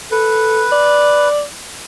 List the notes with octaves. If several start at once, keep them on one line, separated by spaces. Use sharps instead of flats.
A4 B4
D5